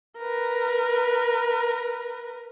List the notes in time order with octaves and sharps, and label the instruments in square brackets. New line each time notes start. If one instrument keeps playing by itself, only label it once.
[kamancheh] A#4 B4